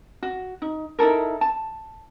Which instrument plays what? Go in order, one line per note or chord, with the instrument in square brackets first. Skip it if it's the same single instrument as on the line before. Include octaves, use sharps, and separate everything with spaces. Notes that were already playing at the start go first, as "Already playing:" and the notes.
[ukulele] F#4
D#4
D#4 E4 A4 A#4
A5